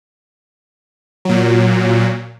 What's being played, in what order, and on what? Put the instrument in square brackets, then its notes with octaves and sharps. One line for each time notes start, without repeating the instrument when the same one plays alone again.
[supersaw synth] A#2 F#3